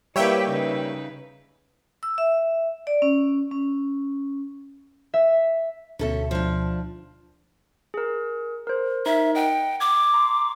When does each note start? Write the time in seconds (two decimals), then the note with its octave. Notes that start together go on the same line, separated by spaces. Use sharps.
0.16 G3 A#3 E4 G4 B4 C#5 E5 G5
0.48 C#3 D#4 B4
2.03 E6
2.18 E5
2.87 D5
3.02 C#4
3.52 C#4
5.14 E5
5.99 D2 B2 C#4 A4 E5
6.31 F3 D4
7.94 G#4 A#4
8.67 A#4 C5
9.06 D#4 A#4 E5
9.35 D#5 F#5 G5
9.80 D6 G#6
10.14 A#5 C6